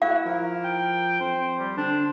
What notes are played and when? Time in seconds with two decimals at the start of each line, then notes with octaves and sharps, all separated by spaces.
0.02 E4 F#4 F5
0.26 F3 A#4
0.64 G5
1.20 F2 C5
1.59 G3
1.77 D3 D4 C5